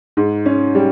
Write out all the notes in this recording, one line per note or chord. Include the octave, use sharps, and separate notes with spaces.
G#2
C#4
G3